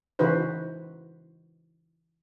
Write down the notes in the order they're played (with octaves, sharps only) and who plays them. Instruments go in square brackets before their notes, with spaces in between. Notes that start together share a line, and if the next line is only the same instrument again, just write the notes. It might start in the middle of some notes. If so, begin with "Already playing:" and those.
[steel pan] C#3 E3 D#4 F#4 B4 C5